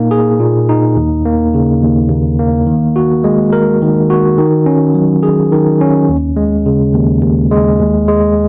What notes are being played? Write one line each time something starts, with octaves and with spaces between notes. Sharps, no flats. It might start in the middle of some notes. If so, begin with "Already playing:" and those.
Already playing: A#2 A#3 D#4
G#4
A#2
D#4
D#2
A#3
C#3
D#2
D#2
A#3
D#3
F#4
G#3
A#4
D#3
F#4
D#3
C#4
F#3
G#4
D#3
C#4
D#2
G#3
C#3
D#2
D#2
G#3
D#2
G#3